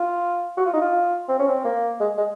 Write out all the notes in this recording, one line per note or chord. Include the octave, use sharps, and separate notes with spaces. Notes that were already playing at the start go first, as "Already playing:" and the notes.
Already playing: F4
F#4
F4
D#4
F4
C4
C#4
C4
A#3
G#3
G#3